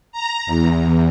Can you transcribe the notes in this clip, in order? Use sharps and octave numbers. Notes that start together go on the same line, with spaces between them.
A#5
E2